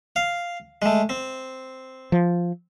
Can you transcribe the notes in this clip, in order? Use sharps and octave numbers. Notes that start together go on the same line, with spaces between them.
F5
G#3 A3
C4
F3